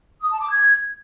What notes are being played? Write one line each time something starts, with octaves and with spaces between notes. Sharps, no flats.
D#6
A5
D6
G#6